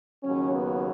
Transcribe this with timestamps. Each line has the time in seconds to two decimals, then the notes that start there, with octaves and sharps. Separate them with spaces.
0.23 D#2 C#3 F#3 C#4
0.52 B3